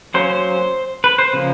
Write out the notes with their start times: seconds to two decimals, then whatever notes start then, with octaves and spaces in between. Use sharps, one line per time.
0.14 F#3 A#3 C#4 C5
0.29 C5
1.04 B4
1.18 C5
1.33 C#3 F3 A#3